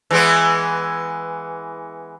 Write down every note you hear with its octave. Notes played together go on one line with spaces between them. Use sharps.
E3 G#3 B3